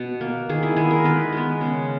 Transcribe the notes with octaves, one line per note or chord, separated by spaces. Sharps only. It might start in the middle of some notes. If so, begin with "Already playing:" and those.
Already playing: B2
A#3
D#3 G#4
E4
G#3 B3 G#4
A#4
D#3 B4
G#3 B3
C#3